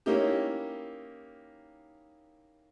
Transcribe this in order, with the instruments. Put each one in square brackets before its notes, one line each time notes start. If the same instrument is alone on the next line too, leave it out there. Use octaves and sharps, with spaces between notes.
[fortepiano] A#3 C#4 D#4 E4 G4